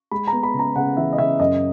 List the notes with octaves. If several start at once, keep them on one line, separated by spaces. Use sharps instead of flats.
G#3 B5
A#5
B3
B5
C#3
A#5
C#3 F#5
E3 E5
D#5
C#3 E5
F#2 D#5